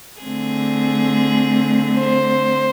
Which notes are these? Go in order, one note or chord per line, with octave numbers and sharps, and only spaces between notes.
D3 A3 C4 G#4
C5